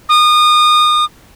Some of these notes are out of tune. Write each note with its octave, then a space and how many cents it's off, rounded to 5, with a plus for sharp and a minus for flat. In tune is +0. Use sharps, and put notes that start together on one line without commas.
D#6 -30